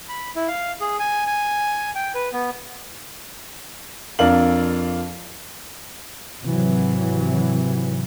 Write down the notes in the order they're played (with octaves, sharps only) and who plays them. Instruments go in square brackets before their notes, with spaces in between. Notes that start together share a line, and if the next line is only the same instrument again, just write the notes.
[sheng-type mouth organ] B5
E4
F5
G#4
G#5
G#5
G5
B4
B3
[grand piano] F2 D4 A#4 F5 F#7
[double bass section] G#1 C3 E3 F#3